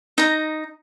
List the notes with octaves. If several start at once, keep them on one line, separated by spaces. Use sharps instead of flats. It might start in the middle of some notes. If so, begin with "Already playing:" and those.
D#4 A#5